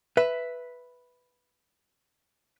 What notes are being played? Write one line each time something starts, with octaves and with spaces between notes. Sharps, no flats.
B4 E5